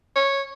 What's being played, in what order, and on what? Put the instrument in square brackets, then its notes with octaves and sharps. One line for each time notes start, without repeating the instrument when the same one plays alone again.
[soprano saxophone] C#5